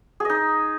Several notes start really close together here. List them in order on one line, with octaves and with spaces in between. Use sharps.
G#4 D#5 D#4